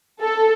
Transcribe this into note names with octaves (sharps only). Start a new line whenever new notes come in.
A4